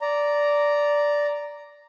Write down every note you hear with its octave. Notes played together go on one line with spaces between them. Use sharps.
D5 A#5